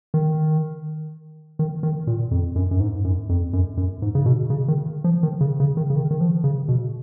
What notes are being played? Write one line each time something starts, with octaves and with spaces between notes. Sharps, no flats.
D#3
D#3
D#3
A#2
F2
F#2
F#2
G#2
F#2
F2
F#2
F#2
G#2
C#3
B2
C#3
D#3
F3
D#3
C#3
C#3
D#3
C#3
D#3
D#3
F3
C#3
B2